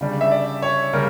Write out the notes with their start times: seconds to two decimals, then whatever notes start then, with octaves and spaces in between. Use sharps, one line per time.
0.01 C#3 G3 D4
0.21 E5
0.31 D5
0.62 C#5
0.93 C#3 G3 A#4